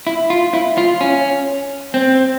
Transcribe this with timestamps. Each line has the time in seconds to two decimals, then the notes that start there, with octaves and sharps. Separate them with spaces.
0.07 E4
0.30 F4
0.54 E4
0.78 F4
1.01 C#4
1.94 C4